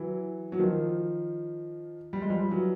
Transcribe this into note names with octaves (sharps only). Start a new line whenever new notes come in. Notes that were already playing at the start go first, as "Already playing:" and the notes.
Already playing: E3 F#3
F#3
D#3 F3
G3
G#3
F3 G3
E3 F#3